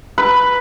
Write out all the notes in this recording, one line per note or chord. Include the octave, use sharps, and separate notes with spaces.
B4